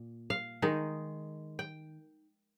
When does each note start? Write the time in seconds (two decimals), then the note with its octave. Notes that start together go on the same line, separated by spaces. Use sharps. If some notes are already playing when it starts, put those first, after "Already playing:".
Already playing: A#2
0.30 F5
0.62 D#3 G#3 D#4
1.59 G5